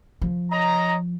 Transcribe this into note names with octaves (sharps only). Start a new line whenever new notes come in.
F3
C#5 D#5 A#5